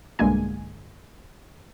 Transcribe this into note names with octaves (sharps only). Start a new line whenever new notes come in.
B1 G2 D3 G#3 A#3 G#5